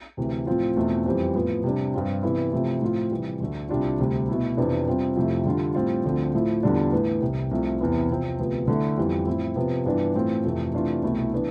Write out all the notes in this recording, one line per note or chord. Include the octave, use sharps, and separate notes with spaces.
D2 C3 E3
A2 F3 C4 F4
E2 B2 A3 C4 F4
F2 E3 G3 C4
A2 F3 B3
C3 G3 D4
G2 F3 C4 F4
C3 E3 B3 E4
C3 F3 A3 E4
A2 F3 C4 F4
C3 E3 G3
D2 D3 A3
C2 C3 G3 D4 F4
D2 C3 G3
B2 A3 E4
F2 C3 E3 B3 D4
C3 G3 C4 F4
F2 C3 F3 A3 E4
D3 G3 D4 F4
A2 G3 C4 F4
D2 D3 F3 C4
A2 F3 A3 E4
E2 D3 G3 D4 F4
A2 E3 B3
C2 C3 G3
C2 C3 F3 A3
E2 C3 E3 B3 E4
C3 F3 C4
D2 C3 F3 B3
D3 A3 E4
F2 E3 G3 B3
A2 F3 C4 E4
C3 F3 B3
G2 E3 B3 D4 F4
A2 E3 A3 C4 F4
F2 C3 E3 A3
C3 E3 A3 D4 F4
C2 B2 A3 E4
E3 B3 D4